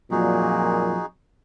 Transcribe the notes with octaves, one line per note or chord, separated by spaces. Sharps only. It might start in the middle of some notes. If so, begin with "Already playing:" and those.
F2 A#2 F#3 D#4 F#4 G#4